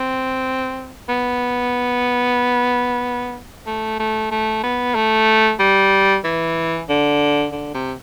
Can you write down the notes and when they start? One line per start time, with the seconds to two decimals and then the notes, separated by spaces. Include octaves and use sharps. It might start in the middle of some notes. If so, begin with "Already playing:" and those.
Already playing: C4
1.09 B3
3.67 A3
3.99 A3
4.31 A3
4.63 B3
4.95 A3
5.59 G3
6.24 E3
6.89 D3
7.52 D3
7.74 C3